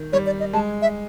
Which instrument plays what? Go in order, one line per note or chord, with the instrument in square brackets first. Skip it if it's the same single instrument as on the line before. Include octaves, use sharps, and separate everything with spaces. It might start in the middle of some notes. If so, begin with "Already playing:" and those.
Already playing: [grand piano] D#3
[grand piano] G3 [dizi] C#5
[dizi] D5
D#5
[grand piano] G#3 [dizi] A5
[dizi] E5